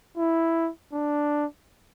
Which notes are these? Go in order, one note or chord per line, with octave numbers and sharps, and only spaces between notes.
E4
D4